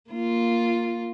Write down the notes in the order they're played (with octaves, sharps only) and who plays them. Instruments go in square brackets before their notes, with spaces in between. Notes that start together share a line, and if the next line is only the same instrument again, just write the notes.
[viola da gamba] A#3 F4